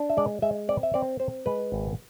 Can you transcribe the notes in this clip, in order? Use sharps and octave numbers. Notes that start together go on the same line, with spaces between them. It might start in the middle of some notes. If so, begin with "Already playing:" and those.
Already playing: D4
E5
G#3 D5
G#3 E5
C4 D5
E5
C4 D5
C4 C5
G#3 B4
G#1